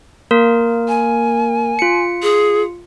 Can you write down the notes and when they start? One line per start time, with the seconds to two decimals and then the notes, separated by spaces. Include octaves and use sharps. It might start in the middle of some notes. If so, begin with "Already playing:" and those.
0.31 A#3 A#4
0.88 G#5
1.79 F4 C#7
2.23 G#4